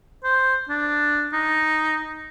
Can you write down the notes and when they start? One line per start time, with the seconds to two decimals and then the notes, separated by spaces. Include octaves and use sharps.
0.24 C5
0.69 D4
1.33 D#4